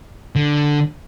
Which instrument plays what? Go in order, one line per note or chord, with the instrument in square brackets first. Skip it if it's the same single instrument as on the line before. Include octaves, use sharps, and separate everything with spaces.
[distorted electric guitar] D3